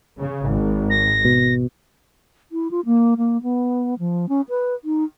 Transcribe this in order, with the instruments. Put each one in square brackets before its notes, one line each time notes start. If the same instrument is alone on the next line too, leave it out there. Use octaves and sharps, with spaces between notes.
[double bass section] C#3
G#1
[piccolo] A#6
[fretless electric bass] B2
[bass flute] E4
F4
A#3
A#3
B3
F3
C#4
B4
D#4